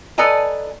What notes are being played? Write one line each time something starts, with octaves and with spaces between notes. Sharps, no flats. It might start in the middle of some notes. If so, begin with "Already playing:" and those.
A4 B4 D5 D#5 G#5 A#5